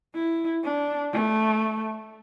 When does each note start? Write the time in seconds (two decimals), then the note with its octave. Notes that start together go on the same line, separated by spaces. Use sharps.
0.15 E4
0.64 D4
1.13 A3